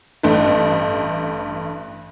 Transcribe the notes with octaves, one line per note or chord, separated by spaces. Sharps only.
A1 G2 A3